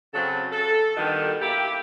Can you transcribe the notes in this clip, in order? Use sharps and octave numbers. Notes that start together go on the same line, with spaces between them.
C#3 F#3 C4 A4
A4
G2 B2 D#3
A#3 E4 G4